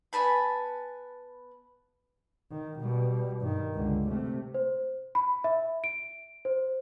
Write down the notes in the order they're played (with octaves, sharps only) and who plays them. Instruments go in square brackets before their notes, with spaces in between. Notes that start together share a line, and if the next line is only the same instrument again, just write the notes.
[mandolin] B3 G#5 A5 B5
[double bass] D#3
B2 G3
G2 D#3
C#2 D3
C3 A3
[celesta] C5
B5
E5
D7
C5